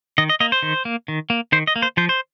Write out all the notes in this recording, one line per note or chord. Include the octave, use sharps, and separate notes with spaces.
D#3 D#5
D#5
A#3 D#5
C5
D#3
A#3
D#3
A#3
D#3 C5
D#5
A#3
C5
F3 C5
C5